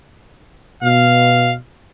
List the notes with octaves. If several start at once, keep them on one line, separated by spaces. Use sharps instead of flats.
B2 F5